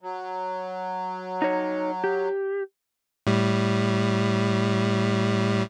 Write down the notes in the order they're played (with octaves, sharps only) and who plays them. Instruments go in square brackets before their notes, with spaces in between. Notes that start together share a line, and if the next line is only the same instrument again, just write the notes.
[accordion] F#3
[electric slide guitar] D#4 C#5
G4
[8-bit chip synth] A2 G3